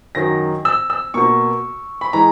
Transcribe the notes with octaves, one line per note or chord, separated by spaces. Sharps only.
F#2 D#3 F#3 A#6
E6
E6
B2 A#3 C#6
B5
E3 G#3 A#5